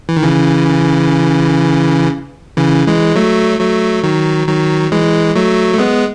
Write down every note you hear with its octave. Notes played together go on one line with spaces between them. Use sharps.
E3
D#3
C#3 E3
C#3 E3
E3 G#3
F#3 A3
F#3 A3
D#3 F#3
D#3 F#3
E3 G#3
F#3 A3
A3
G#3 B3